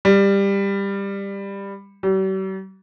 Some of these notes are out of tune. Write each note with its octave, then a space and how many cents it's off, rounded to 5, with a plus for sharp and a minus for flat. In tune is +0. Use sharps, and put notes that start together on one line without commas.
G3 +15
G3 -45